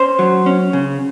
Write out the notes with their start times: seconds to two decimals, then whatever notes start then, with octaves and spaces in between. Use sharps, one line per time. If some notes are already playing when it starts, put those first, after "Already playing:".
Already playing: C#4 C5
0.19 F#3
0.46 C#4
0.73 C#3